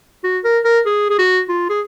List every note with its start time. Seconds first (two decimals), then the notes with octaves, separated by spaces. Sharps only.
0.24 F#4
0.44 A#4
0.65 A#4
0.86 G#4
1.10 G#4
1.19 F#4
1.49 F4
1.69 G#4